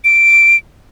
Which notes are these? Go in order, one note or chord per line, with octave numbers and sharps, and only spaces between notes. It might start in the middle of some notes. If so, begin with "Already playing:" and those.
D7